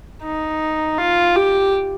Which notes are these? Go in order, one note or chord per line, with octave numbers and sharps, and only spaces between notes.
D#4
F4
G4